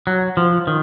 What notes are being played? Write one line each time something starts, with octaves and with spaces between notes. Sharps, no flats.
F#3
F3
D#3